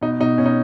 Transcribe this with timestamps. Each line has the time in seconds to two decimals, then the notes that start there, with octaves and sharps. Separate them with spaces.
0.01 B2 D#4
0.20 B2 D#4
0.38 B2 C#4
0.46 D#4